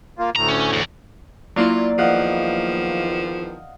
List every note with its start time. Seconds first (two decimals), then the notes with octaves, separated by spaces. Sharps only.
0.19 A#3 F4
0.36 D2 A2 A#5
0.48 C#4
0.73 E2
1.56 F#3 A#3 E4 F4 D5
1.99 E2 D#3 F3 D#5 F5 F#5